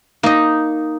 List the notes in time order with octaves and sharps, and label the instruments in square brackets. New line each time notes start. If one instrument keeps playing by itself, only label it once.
[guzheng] A#3 D#5 [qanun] D#4